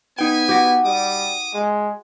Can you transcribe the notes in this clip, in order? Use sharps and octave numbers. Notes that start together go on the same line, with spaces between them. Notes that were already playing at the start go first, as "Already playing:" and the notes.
B3 D#4 E4 G5 G#5
F#4 G4
G3 D6 D#6
G#3